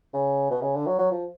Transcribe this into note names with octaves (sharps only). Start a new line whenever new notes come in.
C#3
B2
C#3
D3
F#3
F#3
F3